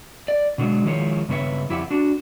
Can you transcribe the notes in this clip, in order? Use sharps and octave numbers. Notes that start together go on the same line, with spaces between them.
D5
B2 D3 F#3 G#3
D#3 F3 G#3 E4 C#5
G2 C#3 B3 B4 C#5 E5
F2 E4 G4 E5 F#5
D4 F#4